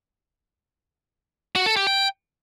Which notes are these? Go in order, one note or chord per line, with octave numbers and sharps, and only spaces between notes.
F#4
A4
G4
G5